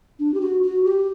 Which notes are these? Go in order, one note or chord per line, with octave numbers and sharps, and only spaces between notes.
D4
G4
F#4
F#4
G4